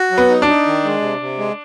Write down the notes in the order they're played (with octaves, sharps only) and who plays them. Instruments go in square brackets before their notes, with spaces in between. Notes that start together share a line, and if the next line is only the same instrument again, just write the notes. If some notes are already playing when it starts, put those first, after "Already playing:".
Already playing: [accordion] F#4
F#3
[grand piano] B3
[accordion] D#4
[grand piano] D4
[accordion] D#4
D#3
G#3
C3
C3
G#3